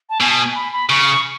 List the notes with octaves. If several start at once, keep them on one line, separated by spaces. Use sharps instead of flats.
A5
B2 G#5
A5
G#5
B5
B5
C#3 C#6